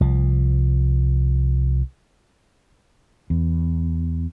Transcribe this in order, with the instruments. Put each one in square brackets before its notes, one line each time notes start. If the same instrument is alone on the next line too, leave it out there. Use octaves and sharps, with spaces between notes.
[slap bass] C2 F3
[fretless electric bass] E2